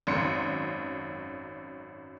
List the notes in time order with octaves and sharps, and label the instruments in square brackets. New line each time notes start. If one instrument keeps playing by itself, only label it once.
[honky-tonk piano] G#1 F#2 C6 C#7